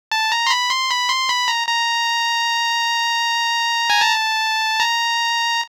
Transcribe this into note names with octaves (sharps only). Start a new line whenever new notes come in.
A5
A#5
C6
B5
C6
B5
C6
B5
A#5
A#5
G#5
A5
A#5